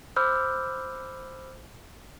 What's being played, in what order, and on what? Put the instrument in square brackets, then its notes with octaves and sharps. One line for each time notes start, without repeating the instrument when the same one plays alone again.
[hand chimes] C5 B5 D6 E6 F6 G6